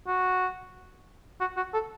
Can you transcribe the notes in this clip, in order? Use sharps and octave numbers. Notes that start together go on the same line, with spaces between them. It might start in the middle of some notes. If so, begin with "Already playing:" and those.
F#4
F#4
F#4
A4